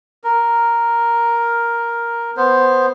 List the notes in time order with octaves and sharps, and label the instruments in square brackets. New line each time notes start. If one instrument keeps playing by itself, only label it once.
[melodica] A#4
B3 C5